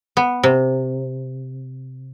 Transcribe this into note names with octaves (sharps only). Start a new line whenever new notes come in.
B3
C3